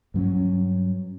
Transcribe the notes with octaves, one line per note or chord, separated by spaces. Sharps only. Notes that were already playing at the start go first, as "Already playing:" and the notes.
G2 F#3 C4 C#4